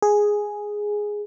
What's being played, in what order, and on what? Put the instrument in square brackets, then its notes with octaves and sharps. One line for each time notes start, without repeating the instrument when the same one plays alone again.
[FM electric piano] G#4